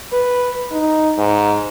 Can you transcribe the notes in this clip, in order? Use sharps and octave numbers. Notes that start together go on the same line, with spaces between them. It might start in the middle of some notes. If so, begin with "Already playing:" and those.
B4
D#4
G#2